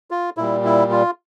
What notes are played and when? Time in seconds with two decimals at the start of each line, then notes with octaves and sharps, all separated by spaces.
0.11 F4
0.37 A#2 G3 E4
0.65 E4
0.92 F4